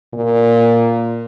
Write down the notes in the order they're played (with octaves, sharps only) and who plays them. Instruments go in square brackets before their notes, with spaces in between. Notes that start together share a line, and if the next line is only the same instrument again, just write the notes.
[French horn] A#2